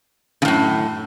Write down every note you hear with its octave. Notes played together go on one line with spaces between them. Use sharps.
F#2 A2 C#3